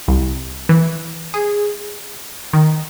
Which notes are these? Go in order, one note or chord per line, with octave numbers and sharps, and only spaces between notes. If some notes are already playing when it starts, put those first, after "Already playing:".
C2
E3
G#4
D#3